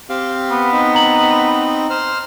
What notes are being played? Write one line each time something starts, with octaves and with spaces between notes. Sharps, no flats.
C4 G4 F5
B3
C4 D#4
A#5 F#7
C5 F6